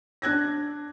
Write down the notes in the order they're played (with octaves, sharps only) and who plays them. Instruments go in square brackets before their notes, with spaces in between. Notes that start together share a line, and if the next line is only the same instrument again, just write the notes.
[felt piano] D4 F#6 G#6 A#6